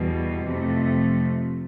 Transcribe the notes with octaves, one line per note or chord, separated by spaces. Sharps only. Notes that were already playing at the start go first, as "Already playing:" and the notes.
Already playing: E2 B2 G3
F2 C3 F3 A3